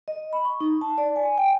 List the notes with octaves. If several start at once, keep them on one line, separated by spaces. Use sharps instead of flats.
D#5
B5
C#6
D#4
A5
D5
G#5
G5